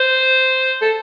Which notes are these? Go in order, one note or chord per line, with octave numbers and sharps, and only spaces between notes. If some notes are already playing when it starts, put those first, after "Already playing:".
Already playing: C5
A4